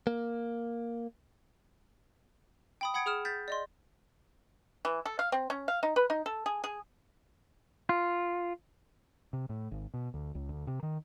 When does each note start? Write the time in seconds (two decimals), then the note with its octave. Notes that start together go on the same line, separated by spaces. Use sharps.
0.07 A#3
2.81 G5 B5 D#6
2.94 F#5 B5 D#6 G#6 C#7 D7
3.06 G#4 D#6 F6 E7
3.25 G6 A6 B6
3.48 D5 D#5 C6
4.85 E3
5.05 A4
5.19 F5
5.32 C4
5.50 C#4
5.68 F5
5.83 D#4
5.96 B4
6.10 D#4
6.26 A4
6.46 G#4
6.64 G#4
7.89 F4
9.33 C3
9.49 A2
9.72 G#1
9.94 B2
10.14 D2
10.35 C#2
10.49 D2
10.67 C3
10.83 D#3